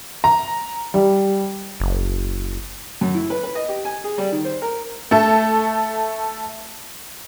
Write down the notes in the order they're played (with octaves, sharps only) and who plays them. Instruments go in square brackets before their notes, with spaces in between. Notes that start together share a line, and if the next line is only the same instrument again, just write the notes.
[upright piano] A#5
G3
[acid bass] F#1
[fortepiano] F#2
E4
B4
B4
D#5
G4
G#5
G#4
G3
D#3
C5
A#4
[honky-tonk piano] A3 A4